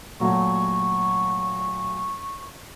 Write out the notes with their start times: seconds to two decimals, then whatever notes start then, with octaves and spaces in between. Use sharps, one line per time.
0.20 A#2 F#3 A3 C#6